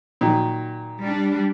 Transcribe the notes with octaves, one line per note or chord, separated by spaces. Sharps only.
A#2 D#3 F#3
G3 D4